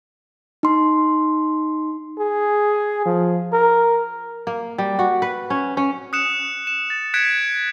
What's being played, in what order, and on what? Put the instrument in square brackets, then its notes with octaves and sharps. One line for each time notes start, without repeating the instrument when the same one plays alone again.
[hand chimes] D#4 C6
[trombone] G#4
F3
A#4
[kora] A#3
G3
F#4
B4
C#4
C#4
[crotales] D#6 F#6 C#7 E7
E7
A6
F#6 G#6 B6 C#7 D7 E7